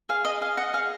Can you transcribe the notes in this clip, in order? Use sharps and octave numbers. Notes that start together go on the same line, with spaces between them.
G#4 F5
G#4 D#5
G#4 F5
D#5 F#5
G#4 F5